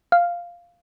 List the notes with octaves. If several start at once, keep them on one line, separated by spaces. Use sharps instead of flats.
F5